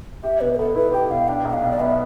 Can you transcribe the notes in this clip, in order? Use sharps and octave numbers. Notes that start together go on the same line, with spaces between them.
G4 E5
B2 B4
B4
B3 A4
E4 B4
G4 G5
B2 F5
D4 G5
B1 G5
F5
B2
D5
B3 E5